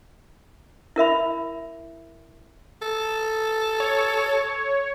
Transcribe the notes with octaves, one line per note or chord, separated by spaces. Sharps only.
E4 A#4 E5 B5
A4
C#5